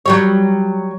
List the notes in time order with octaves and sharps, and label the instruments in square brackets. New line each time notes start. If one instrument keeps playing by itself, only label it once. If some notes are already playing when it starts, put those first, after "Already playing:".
[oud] F#3 G3 C#5